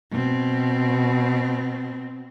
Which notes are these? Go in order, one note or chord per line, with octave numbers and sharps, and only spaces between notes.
B2 C4